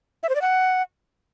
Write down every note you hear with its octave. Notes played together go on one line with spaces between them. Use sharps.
E5
C5
D5
F#5